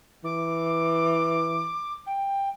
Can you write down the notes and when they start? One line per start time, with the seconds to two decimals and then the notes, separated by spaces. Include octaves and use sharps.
0.24 E3 D6
2.06 G5